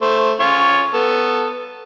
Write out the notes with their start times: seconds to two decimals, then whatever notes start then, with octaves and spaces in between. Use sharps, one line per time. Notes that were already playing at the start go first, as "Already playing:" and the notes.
0.02 A3 C5
0.40 C#4 F4 C#5
0.94 B3 A4